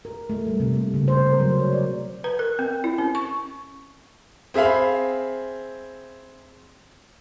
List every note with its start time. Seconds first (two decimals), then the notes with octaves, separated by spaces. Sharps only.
0.05 A#4
0.30 A3
0.47 G3
0.60 C3
0.74 A#3
0.94 C#3
1.08 C5
1.27 A#4
1.40 F#3
1.60 C#5
1.73 D5
2.24 B4
2.39 A#4
2.59 C4
2.84 E4
2.98 C#4
3.15 C#6
4.54 C4 G#4 E5 F5 B5